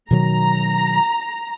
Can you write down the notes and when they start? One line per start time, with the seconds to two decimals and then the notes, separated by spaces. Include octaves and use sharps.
0.11 B2 D#3 F#3 A#5